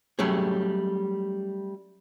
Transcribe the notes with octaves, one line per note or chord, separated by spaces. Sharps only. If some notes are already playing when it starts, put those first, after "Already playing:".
F#3 G3 A3 C#4 G#4